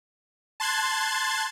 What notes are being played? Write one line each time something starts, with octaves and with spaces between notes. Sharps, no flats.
A5 C6 F#6 G#6 A6